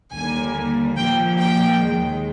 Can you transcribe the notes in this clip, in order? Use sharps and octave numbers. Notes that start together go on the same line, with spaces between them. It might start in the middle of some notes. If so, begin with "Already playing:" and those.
D#2 D3 G3 A#3 G#5
A#2 F3 A#3 G5
G5
D#2 D#3 G#3